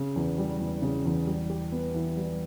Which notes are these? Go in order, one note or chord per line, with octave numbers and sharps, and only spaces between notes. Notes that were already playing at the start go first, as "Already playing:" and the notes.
Already playing: C#3
E2
G3
E2
C#3
E2
G3
G4
B3
E3
G3